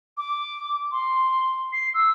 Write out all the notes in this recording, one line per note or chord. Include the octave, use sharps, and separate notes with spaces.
D6
C6
C7
E6